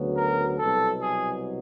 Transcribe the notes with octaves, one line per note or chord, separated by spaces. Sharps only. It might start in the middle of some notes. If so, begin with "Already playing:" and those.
Already playing: D2 C#3 F#3 B3
A#4
C2 B2 F#3 B3 A4
G#4